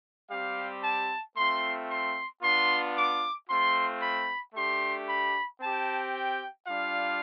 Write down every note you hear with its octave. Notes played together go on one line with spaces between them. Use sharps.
G3 C4 G4 F5
A5
A3 C4 F4 C6
C6
B3 D4 F4 C6
D6
A3 C4 F4 C6
B5
A3 D4 G4 C6
B5
C4 G4 A5
G5
G3 D4 F4 F5